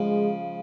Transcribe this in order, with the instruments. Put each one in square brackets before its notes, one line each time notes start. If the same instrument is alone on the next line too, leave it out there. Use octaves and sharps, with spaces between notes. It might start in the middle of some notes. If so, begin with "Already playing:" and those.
Already playing: [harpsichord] C#3 F3 [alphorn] G#3